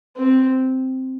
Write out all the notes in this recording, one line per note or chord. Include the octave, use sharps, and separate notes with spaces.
C4